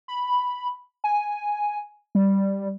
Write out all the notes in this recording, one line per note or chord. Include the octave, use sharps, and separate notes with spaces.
B5
G#5
G3